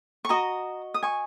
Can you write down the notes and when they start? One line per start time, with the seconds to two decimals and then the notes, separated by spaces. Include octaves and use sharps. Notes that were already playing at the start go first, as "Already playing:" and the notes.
0.25 C#6
0.29 F#4 D#5 A#5 D#6
0.94 D#6
1.03 G#5 C#6